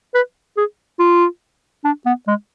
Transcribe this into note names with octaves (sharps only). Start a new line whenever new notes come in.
B4
G#4
F4
D4
B3
G#3